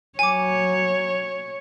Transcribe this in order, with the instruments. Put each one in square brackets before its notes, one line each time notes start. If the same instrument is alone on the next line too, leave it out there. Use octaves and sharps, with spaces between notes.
[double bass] F#3 [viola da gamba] C#5 [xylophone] G#5 D6